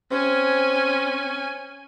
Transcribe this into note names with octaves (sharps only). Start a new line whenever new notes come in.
C4 C#4 G#5